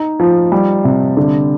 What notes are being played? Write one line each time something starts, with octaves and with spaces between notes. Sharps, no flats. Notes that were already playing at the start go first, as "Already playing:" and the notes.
Already playing: D#4
F3
G3
C3
D3